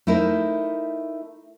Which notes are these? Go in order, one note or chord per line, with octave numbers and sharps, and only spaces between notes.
A3 D#4 E4 A#4 C5